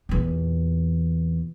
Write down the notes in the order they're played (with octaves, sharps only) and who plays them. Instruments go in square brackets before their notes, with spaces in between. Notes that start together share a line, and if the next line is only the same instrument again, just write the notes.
[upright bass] E2 A#2